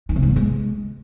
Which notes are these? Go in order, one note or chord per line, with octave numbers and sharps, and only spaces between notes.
D#3
C3
G#3
B3
G#3